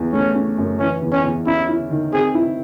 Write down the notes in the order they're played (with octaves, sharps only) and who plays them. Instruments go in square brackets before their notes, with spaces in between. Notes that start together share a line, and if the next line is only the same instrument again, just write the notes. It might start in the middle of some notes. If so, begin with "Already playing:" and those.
Already playing: [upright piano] E2
[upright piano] A3 [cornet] C#4
[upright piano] C#4
F#2
[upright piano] E3 [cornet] C#4
[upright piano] E2
[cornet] C#4
[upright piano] E2
[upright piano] C#4 [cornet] E4
[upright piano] E4
D#3
[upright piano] C4 [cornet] G#4
[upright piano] E4